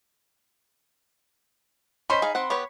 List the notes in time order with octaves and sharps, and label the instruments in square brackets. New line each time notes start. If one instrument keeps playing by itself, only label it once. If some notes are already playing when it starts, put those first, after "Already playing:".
[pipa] C#4 C5 [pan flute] D#5 [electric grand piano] B5 B6
[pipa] D#4 [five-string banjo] G#4 F5
[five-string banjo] C4 F#5 [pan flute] C6
[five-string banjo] B3 G4 B4 [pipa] C#5